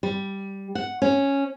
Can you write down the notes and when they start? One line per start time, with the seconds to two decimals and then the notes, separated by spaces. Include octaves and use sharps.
0.03 G3
0.75 F#5
1.02 C#4